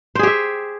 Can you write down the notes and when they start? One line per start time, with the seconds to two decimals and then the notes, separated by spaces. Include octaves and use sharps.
0.15 C5
0.19 G#4
0.23 G4
0.27 E5